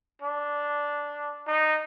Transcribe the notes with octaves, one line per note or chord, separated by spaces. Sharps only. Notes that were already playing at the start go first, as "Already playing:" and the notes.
D4
D#4